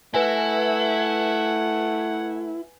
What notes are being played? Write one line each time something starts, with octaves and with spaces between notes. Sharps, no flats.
A3 E4 B4 F#5 G#5